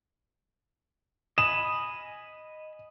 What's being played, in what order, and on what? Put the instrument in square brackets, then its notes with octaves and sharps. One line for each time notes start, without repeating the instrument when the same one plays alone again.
[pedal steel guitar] D#5 G#5 B5 [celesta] D#6 [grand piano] E7